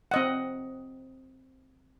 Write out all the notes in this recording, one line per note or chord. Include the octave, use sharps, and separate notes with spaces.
C4 D#5 F#5